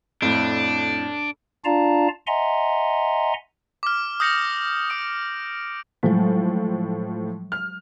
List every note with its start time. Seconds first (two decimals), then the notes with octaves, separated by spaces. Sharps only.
0.22 F2 A2 D4
1.65 D4 F4 D5 F5 A5 A#5
2.27 D#5 E5 F#5 G#5 A#5 C6
3.83 D6 F6
4.20 D#6 G6 A#6 C#7 F7 F#7
4.90 D#6 D7
6.03 A2 F3 F#3 G#3
7.52 F6